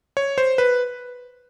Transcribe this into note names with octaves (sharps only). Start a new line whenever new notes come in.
C#5
C5
B4